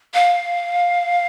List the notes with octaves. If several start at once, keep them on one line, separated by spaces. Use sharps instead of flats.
F5